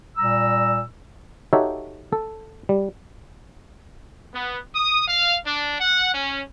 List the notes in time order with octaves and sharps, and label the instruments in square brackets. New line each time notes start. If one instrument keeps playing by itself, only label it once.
[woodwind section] A#2 G3 A#5 E6
[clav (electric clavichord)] D#4 F#4 G4 A4 C#5 E5
A4
G3
[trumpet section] B3
D#6
F5
D4
F#5
C#4